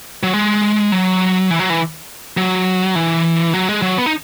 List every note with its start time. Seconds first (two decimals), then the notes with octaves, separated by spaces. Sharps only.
0.23 F#3
0.33 G#3
0.92 F#3
1.50 E3
1.59 F#3
1.70 E3
2.37 F#3
2.95 E3
3.54 F#3
3.69 G#3
3.82 F#3
3.98 B3
4.06 D#4